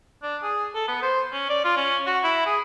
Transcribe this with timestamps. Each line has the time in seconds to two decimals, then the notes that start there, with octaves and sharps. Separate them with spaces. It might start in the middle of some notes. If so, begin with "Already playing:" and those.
0.23 D4
0.43 G#4
0.75 A4
0.88 B3
1.03 C5
1.33 C#4
1.49 D5
1.64 F4
1.77 C#4
2.06 F#4
2.24 E4
2.46 G#4